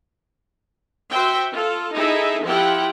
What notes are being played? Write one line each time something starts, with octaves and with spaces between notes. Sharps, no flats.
F#4 C5 E5 G5
F4 A4
D#4 E4 G#4 A4 E5
F3 E4 F4 G4 F#5 G5